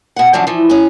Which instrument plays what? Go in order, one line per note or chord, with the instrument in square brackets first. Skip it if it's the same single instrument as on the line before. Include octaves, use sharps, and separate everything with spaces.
[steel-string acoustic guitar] B2 F#5
F#2 D3 F3 F#3 D4
E3 F3
C#4 G#4